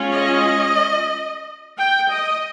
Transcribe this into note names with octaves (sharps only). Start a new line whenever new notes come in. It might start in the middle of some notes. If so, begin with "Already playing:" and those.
Already playing: G#3 C#4 F4
D#5
G5
D#5